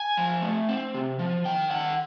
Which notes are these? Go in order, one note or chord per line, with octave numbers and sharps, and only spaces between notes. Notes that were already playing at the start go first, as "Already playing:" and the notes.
Already playing: G#5
F3
A3
C4
C3
F3
D#3 G5
D#3 F#5